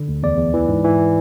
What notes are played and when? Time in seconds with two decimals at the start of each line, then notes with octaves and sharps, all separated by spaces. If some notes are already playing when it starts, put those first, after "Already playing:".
Already playing: D3
0.08 D2
0.23 E2 D5
0.38 E2
0.54 E3
0.69 G#2
0.85 E3